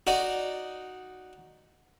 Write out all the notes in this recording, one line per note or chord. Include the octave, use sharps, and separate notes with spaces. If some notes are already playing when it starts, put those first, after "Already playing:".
D#4 F#4 D5